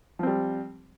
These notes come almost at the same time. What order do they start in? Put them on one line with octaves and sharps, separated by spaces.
F3 C4 G3